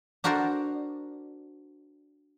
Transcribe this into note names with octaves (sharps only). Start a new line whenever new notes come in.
D4 F#4 A#4 C5 D5